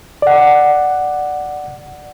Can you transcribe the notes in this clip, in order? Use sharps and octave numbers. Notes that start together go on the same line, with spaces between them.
D5 F#5